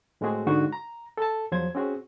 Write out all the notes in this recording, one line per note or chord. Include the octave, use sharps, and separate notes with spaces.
A2 G#3 A3 C4 F#4 G#4
G#2 D3 D#4 F#4
A#5
A4 A5
E2 F3 F#3 C5 G#6
C4 C#4 F#4 G#4